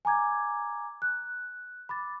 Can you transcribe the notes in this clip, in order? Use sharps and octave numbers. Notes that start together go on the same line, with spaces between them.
G#5 A#5 D6 G#6
F#6
B5 D6 A6